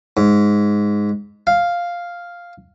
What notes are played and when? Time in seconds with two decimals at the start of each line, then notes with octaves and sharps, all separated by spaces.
0.17 G#2
1.47 F5